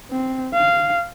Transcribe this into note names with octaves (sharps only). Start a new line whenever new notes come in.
C4
F5